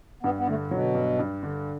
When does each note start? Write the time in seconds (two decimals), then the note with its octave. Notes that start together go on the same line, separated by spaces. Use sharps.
0.23 G2 B3
0.38 B3
0.47 D3 A3
0.66 A2
0.71 B2 F#3
0.95 G2
1.19 G2
1.43 D3